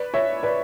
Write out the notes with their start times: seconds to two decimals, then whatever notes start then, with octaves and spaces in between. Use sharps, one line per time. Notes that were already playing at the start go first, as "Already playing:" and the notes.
Already playing: B4 D5
0.14 C#5 E5
0.43 B4 D5